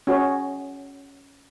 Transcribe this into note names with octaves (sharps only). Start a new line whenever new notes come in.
C#4 F#4 G#4 C#5